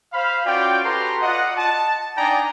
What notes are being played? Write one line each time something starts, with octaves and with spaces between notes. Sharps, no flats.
C5 F5 B5
C#4 F4 F#4 D5 G5
F#4 G4 A4 B4 A#5 C6
F4 D5 D#5 F#5
A5
D4 D#4 D5 G5 G#5 A#5